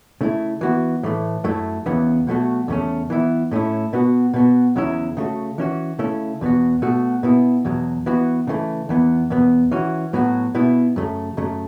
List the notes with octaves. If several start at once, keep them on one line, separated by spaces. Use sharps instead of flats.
C#3 A3 E4
E3 B3 F#4
A2 E3 A3
F#2 F#3 A3 E4
E2 C#3 E3 B3
B2 F#3 A3 F#4
E2 C#3 A3 C#4
E3 B3 E4
A2 A3 C#4 E4
B2 B3 F#4
B2 B3 F#4
E2 C#3 F#3 C#4 E4
C#3 A3 F#4
E3 C#4 F#4
C#3 A3 C#4 E4
E2 B2 B3 F#4
B2 A3 F#4
B2 B3 E4
E2 B2 F#3
E3 B3 F#4
C#3 E3 A3
E2 E3 B3
E2 B2 B3
E3 C#4 F#4
A2 F#3 B3 F#4
B2 B3 E4
F#2 C#3 A3
F#2 C#3 A3